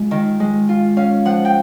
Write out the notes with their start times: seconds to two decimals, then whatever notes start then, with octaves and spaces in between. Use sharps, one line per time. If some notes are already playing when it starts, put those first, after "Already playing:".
Already playing: G#3 F4
0.11 D#3
0.40 G#3
0.69 F4
0.96 C#4 F5
1.25 F3 F#5
1.45 G5